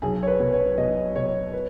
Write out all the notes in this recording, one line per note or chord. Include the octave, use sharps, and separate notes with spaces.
B1 G#4
C#5
B4
B2
C#5
B2 D#5
B2 C#5
B4